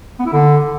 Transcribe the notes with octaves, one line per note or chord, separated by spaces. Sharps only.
B3
E4
D3